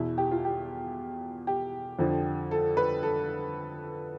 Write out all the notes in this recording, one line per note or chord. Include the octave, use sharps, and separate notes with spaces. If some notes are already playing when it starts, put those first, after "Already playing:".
Already playing: E2 B2 E4
G4
F4
G4
G4
F2 D3 F3
A4
B4
A4